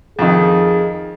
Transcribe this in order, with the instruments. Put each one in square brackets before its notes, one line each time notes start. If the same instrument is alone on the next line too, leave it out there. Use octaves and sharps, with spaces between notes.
[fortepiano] F2 D#3 [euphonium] G#4